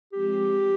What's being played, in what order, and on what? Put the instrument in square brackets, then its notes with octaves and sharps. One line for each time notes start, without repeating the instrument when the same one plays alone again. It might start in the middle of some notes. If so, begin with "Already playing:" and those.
[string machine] F3 G#3 C4 [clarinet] G4